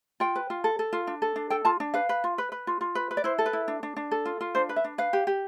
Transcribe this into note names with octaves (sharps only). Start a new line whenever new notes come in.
F4 G5
B4
F4
A4
A4
F4
D4
A4
D4
A4 G5
F4 A5
D4
B4 F5
B4
F4
B4
B4
F4
F4
B4
B4
D5
E4 C5
A4
B4
E4
D4
D4
D4
A4
F4
F4
D4 C5
B4
E5
D4
B4 F5
G4
G4